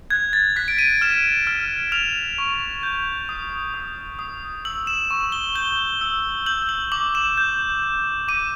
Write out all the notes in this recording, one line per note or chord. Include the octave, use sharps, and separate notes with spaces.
F#6 G#6
A6
F#6 B6
D7
D#7
F6 E7
F6
F6 F7
C#6
G6
D#6
D#6
D#6
E6 F#7
E7
C#6
G7
G6 G7
E6
G6 F#7
F#7
D6 F#7
E7
G6
G6
D6 D#7